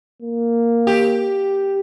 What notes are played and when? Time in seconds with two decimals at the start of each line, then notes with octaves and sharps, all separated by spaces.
0.22 A#3
0.87 G4